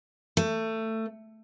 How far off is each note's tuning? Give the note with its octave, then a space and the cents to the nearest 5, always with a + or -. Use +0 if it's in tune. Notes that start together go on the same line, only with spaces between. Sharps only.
A3 +20